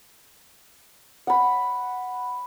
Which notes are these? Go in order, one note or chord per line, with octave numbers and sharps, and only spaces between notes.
F#5 B5